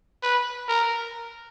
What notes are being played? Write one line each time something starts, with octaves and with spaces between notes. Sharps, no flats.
B4
A#4